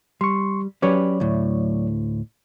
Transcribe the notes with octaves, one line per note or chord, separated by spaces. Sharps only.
G3 C6 C#6
F#3 C#4 G4 B4 C#5 D5
D2 A2